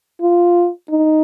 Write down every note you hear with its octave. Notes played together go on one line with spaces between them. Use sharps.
F4
D#4